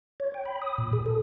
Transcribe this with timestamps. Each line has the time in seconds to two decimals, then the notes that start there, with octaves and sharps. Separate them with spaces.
0.20 C#5
0.34 G5
0.45 B5
0.62 D#6
0.78 A#2
0.93 G#4
1.06 A4